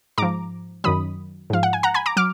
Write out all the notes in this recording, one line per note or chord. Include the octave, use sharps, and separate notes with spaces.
G#2 F3 A#5 D6
F#2 D#3 F#3 B5 D#6
G#2 F3 F5
F#5
G#5
F#5 A#5
G#5 B5
A#5 D6
F#3 D6 F6